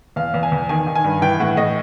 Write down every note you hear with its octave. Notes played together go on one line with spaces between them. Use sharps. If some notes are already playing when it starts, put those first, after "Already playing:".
E2 F5
E2
G#5
E2
D#3 G#5
D#3
G#5
G2
E3 G5
A2 F#5
A2 D#5